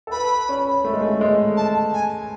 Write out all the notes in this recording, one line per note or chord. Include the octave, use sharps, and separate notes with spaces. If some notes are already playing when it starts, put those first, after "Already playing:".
A4
B4 B5
C#4
A3
G#3
A3
G#3
A5
G#5